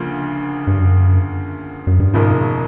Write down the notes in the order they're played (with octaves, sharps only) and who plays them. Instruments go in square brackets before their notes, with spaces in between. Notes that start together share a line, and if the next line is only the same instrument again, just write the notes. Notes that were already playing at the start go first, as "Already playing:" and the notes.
Already playing: [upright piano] D2 C#3 F3 A#3
[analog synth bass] G2
F#2
F#2
G2
[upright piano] E1 D#2 C#3 F3 [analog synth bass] G#2